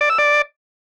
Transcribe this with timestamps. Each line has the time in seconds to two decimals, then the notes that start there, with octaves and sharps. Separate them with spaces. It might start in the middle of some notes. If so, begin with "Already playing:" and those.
0.01 D5
0.10 E6
0.19 D5